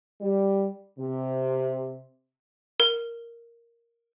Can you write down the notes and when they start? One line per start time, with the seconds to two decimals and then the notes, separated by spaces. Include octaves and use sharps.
0.21 G3
0.98 C3
2.80 A#4